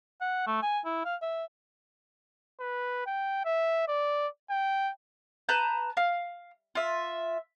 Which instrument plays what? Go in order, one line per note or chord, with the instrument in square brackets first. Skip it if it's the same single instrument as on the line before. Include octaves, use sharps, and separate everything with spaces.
[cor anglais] F#5
A3
G#5
E4
F5
E5
[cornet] B4
G5
E5
D5
G5
[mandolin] B4 A5 A#5 G6
F5
F4 E5